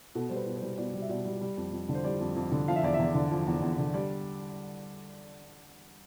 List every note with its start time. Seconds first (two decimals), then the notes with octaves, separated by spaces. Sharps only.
0.15 B2 A4
0.29 G3 C5
0.36 B4
0.46 B2
0.57 C5
0.62 G3
0.78 B2 D5
0.94 G3
1.02 E5
1.09 B2 D5
1.26 G3
1.41 G3
1.57 F2
1.73 F2
1.89 D3
1.94 C5
2.04 G3 D5
2.21 F2
2.36 F2
2.52 D3
2.68 F3 F5
2.76 E5
2.83 E2 D5
2.94 E5
2.99 E2
3.14 D3
3.31 F3
3.47 E2
3.62 E2
3.79 D3
3.94 G3 D5